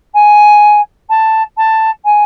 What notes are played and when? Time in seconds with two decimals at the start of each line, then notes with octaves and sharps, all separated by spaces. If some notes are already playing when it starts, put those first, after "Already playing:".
0.14 G#5
1.09 A5
1.57 A5
2.05 G#5